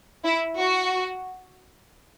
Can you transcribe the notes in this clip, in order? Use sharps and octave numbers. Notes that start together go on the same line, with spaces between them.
E4
F#4